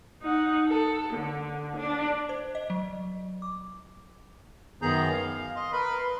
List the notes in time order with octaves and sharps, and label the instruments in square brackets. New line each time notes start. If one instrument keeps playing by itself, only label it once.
[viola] D#4 F#5
A4
D3
D4
[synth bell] C5
D#5
F#3
D6
[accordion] F#2 D#3 B3 G#4 A#5 G6
F5
D#5 C6
A#4 B4 B5
C6